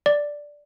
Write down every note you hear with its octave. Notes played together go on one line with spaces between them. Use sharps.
D5